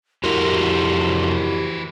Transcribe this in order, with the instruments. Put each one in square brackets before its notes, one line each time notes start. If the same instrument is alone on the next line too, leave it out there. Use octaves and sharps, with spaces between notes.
[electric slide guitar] F2 A3 A#4 [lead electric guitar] E3 C5 [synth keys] E4 F#4 [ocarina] G4